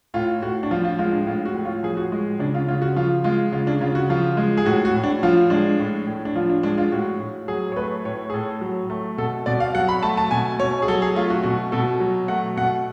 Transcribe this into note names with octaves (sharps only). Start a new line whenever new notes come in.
A2 F4
A2 F#4
D4
F3 F4
F4
G#3 F4
D4
A2 F4
F#4
A2
F4
F3 G#4
F#4
G#3
C#3 D4
F4
C#3 F4
F#4
F3 F4
G#3 F4
C#3 F4
D4
C#3 F4
F#4
F3 F4
G#3
G#4
A2 F#4
F#4
A2
D4
F3 F4
G#3 D4
A2
A2
D4
F3 F4
D4
G#3 D4
F4
A2 F#4
A2
F#3 G#4
C#5
A3 B4
A2 C#5
G#4
A2 A4
F#3
A3
B2 A4
B2 D5
F5
F#3 F#5
B5
A3 A5
A5
B2 G#5
B2 C#5
G#4
F#3 A4
G#4
A3 F4
F#4
B2 F#4
B2 A4
F#3
A3 F#5
B2 F#5